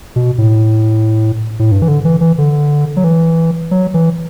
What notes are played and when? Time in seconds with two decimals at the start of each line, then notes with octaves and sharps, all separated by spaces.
0.16 B2
0.38 A2
1.59 A2
1.72 G2
1.82 E3
1.88 D3
2.05 E3
2.21 E3
2.38 D3
2.97 F#3
3.04 E3
3.71 F#3
3.94 E3